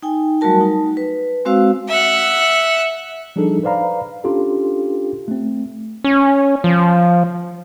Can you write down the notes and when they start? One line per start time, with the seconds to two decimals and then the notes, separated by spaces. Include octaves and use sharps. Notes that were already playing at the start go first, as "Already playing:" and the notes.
0.02 D#4 G5 G#5
0.41 F#3 G3 A3 F#4 A#4 A5
0.60 D#4
0.97 B4
1.45 G#3 C4 F#4 C5 F5 E6
1.88 E5 F#5
3.36 F3 G3 D4 D#4 G#4 A4
3.63 B4 C5 D5 F5 A#5 B5
4.24 C#4 D4 F4 G4 A4
5.28 A3 C4
6.04 C#4
6.64 F3